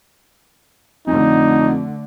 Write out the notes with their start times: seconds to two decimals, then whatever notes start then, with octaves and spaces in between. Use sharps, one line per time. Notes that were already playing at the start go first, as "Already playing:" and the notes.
1.07 F2 D3 A3 D#4